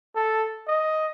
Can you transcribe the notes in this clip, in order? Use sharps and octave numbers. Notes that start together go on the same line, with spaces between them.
A4
D#5